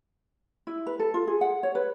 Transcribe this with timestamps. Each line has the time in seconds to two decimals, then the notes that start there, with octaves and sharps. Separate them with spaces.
0.67 E4
0.87 B4
0.99 A4
1.14 F4
1.27 G#4
1.41 F#5
1.63 C#5
1.75 B4